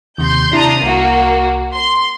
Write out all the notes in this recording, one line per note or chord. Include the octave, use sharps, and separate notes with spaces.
D#2 C3 C6 G6
C3 D4 E4 A#5 D#6 C7
C2 A#3 F#4
C6